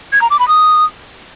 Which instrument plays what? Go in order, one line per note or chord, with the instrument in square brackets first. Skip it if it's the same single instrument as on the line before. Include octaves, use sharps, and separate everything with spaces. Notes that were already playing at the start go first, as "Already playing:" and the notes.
[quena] G#6
A#5
D6
B5
D#6